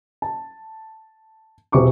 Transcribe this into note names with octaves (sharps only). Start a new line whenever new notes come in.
A5
E1 C3 C#6 D6